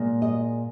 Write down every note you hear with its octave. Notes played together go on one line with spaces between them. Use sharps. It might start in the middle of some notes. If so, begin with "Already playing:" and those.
Already playing: A#2 G#3
D#5